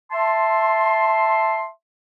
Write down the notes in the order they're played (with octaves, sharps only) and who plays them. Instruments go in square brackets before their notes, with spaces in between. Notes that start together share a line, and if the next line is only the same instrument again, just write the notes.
[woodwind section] E5 A5 C6